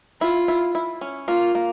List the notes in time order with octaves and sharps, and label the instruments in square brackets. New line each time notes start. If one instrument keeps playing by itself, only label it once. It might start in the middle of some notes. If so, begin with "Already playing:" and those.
[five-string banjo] E4 [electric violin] F4
[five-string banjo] E4
E4
C#4
[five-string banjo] A#3 [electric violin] F4
[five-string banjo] A#3